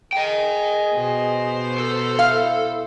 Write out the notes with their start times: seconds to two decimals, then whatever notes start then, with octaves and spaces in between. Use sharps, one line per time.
0.13 G#4 D#5 G5
0.94 B2 C5
1.78 A4
2.19 E4 F5